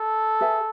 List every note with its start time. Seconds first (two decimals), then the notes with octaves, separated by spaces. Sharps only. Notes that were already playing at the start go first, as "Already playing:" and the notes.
Already playing: A4
0.41 G#4 B4 E5 G#5